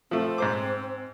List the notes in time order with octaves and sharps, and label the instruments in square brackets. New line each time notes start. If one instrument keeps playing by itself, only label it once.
[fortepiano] F3 A3 [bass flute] C4
[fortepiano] G#2 C5 D6